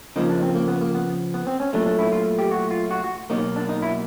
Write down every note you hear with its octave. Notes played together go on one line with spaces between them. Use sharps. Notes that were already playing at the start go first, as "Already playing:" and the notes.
C#3 F3 A#3 D#4
D4
C4
A#3
B3
A#3
B3
B3
C4
C#4
A#2 F#3 A3 D4
D4
E4
F4
G4
F#4
F4
F#4
F#4
B2 F#3 A#3 D#4
D4
D#4
E4